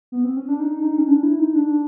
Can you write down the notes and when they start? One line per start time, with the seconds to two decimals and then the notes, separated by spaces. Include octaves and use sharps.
0.12 B3
0.24 C4
0.37 C#4
0.48 D4
0.60 D#4
0.79 D4
0.83 D#4
0.98 C#4
1.08 D4
1.23 E4
1.39 D#4
1.55 D4